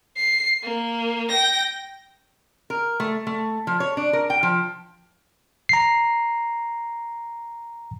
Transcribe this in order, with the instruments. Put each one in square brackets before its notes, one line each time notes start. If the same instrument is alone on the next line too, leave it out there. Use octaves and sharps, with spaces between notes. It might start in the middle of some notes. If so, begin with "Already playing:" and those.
[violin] C7
A#3
G5 A#6
[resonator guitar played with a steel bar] A#4
A3
A3
F3
C#5
D4
A#4
G5
F3
[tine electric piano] A#5 C7